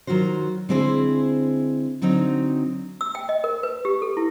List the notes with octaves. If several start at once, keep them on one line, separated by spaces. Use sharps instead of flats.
D#3 F#3 F4 F#4 C5
D3 G#3 C4 E4 G#4 C5
D3 F#3 C4 D#4
E6
G5
D#5
A#4
B4
G4
A4
E4